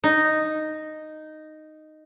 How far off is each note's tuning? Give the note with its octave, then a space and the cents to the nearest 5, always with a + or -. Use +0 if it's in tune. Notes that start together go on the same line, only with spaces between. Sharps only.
D#4 -5